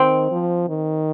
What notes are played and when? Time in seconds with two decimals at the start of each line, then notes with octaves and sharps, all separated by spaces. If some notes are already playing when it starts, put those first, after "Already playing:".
Already playing: D#3 C4
0.31 F3
0.69 D#3